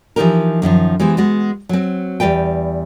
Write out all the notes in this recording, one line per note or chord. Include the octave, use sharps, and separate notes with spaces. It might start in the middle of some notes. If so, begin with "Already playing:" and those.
E3 F3 A3 D#4 G4 A#4
F#2 D3 D#3 F3
E3 G#3 B3 G4 C5
G#3 B3 F#4
F#3 C4
E2 C#3 G3 B4 G5